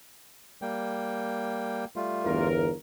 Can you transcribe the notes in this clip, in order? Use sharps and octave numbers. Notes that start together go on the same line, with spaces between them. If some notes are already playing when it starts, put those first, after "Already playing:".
G3 A#3 G5
G3 A3 F4
G1 E2 A#4